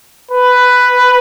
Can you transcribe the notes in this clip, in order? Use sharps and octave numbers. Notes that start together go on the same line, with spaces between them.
B4